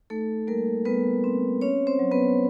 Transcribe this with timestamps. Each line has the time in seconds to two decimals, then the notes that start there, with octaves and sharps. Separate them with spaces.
0.10 A3 D#4 A4
0.47 G3 A#3 A#4
0.85 G3 B3 B4
1.24 C4
1.61 C#4 C#5
1.87 C4 C5
1.99 F#3
2.12 B3 B4